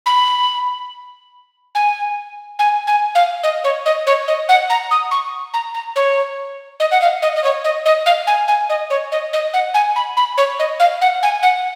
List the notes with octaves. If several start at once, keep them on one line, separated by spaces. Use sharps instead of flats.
B5
G#5
G#5
G#5
F5
D#5
C#5
D#5
C#5
D#5
F#5
A#5
D#6
C#6
A#5
A#5
C#5
D#5
F#5
F5
D#5
D#5
C#5
D#5
D#5
F5
G#5
G#5
D#5
C#5
D#5
D#5
F#5
G#5
B5
B5
C#5
D#5
F5
F#5
G#5
F#5